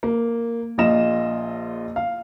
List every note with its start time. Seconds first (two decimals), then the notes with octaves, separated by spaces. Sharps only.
0.03 A#3
0.78 A#1 A#2 F4 D#5 A#6 E7
1.96 F5